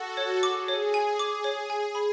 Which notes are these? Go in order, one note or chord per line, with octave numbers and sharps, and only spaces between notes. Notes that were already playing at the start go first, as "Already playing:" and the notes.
Already playing: F#4 A4
C#5
G#4 D6
C#5
G#5
G#4 D6
C#5
G#5
B5